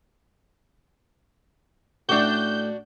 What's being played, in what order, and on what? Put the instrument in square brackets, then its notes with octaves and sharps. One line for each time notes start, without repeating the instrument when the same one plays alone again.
[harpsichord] A2 G4 E5 [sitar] D4 F#4 [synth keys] G6